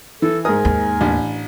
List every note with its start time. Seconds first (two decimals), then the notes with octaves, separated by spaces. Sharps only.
0.22 E3 A4
0.45 G#2 A#4 G#5 D#6
0.65 D#2
1.01 A1 D4